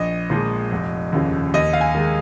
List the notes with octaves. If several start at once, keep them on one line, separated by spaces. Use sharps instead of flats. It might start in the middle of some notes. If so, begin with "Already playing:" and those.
Already playing: A#1 D#5
A#2 F3 G#3
F1
D#2 C#3 F3
D#2 D#5
F5
G#5
D#3 G#3